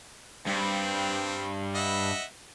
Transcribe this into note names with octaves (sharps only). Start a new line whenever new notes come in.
G2 C4
D#5 E5 F#5